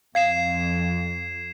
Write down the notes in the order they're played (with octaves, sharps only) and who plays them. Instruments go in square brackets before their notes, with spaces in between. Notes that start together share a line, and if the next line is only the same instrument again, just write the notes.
[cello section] F2 [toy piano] F5 [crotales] G#6 C7 E7